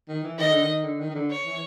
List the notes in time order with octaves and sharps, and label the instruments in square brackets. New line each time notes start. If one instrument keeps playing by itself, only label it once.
[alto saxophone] D#3
E3
[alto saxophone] D#3 [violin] D#5
[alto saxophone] D3
D#3
D3
D#3
D#3
D3
[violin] C#5
[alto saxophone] E3